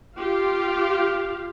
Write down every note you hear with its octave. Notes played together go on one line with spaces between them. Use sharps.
F4 G4 F5